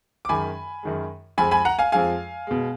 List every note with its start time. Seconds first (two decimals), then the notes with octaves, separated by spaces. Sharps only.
0.25 D6
0.29 F#2 D#3 G#3 G#5 B5
0.83 F#2 D#3 G#3
1.38 F2 F3 G#3 G#5 B5
1.51 G#5 B5
1.65 F#5 A#5
1.79 F5 G#5
1.92 F2 F3 G#3 F5 G#5
2.47 B2 G#3